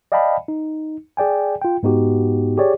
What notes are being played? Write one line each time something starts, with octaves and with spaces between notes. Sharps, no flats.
D5 D#5 F5 G5 A5 B5
D#4
G#4 D5 G5 G#5
F4 G5
G#2 B3 D#4 F#4 G4
G4 G#4 C#5 D5